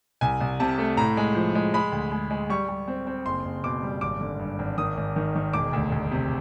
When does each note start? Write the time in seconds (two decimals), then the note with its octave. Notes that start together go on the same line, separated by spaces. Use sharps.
0.21 C2 G#5
0.41 C2
0.60 C3 A5
0.78 A3
0.97 A2 A#5
1.17 G#3
1.35 F3
1.55 G#3
1.74 G#3 B5
1.92 D2
2.12 G#3
2.31 G#3
2.50 G3 C#6
2.68 G3
2.88 C4
3.07 C4
3.26 F#1 C6
3.45 F#1
3.64 B2 D6
3.83 G3
4.01 G#1 D6
4.21 D3
4.39 G2
4.59 G#1
4.78 D#3 D#6
4.97 G#1
5.16 D#3
5.36 D#3
5.53 E1 D6
5.73 D2
5.92 D2
6.11 C3